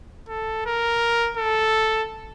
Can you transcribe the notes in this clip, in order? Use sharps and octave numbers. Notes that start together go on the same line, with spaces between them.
A4
A#4
A4